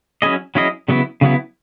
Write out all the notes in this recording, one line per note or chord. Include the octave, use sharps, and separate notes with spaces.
F#3 C#4 E4 G#4 D#5
F#3 C#4 E4 G#4 D#5
C#3 F#3 B3 E4
C#3 F#3 B3 E4